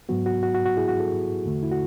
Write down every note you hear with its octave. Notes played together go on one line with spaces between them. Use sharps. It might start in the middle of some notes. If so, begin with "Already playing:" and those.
G#2 F#3 B3 F#4
F#4
F#4
F#4
F#4
E4 G#4
F#4
F#4 A4
E2 D3 A3
E4
F#4